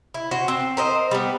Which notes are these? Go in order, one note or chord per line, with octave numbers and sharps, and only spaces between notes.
E4
F#4 C5
C4
A#4 C5 D#5
G3 B3